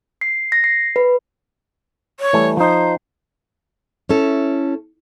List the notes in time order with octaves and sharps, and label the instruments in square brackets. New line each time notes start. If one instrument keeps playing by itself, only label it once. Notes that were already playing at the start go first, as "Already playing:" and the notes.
[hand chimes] C7
A#6
C7
B4
[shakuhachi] C#5
[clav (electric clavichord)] E3 G3 A3
[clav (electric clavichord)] F3 D#4 [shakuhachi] C5
[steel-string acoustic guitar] C#4 E4 A4